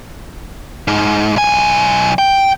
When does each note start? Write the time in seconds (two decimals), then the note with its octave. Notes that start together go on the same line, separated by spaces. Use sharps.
0.88 G#2
1.36 B1 G#5
2.19 G5